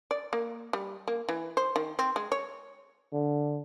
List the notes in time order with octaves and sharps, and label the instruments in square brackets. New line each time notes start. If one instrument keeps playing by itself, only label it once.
[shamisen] D5
A#3
G3
A#3
E3
C5
D#3
C4
G#3
C#5
[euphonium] D3